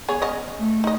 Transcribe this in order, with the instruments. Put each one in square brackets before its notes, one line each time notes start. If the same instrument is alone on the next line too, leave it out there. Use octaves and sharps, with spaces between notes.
[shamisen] B3 G#4 C#5
B3 C#4 D#5
[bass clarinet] A3
[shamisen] D#4 D#5